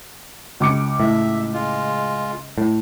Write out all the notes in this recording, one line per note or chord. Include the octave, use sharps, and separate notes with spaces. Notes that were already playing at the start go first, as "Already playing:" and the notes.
C#2 D6 C#7
A2 E5
G#3 F4
A2